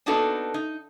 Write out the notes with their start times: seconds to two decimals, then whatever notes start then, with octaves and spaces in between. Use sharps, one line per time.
0.06 A#3 B3 D4 D#4 F#4 A4
0.54 D#4